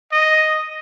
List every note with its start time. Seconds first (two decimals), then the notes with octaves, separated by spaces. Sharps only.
0.12 D#5